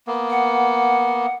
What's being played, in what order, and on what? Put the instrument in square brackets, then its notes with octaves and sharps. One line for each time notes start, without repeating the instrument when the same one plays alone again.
[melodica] A#3 B3
[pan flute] F#5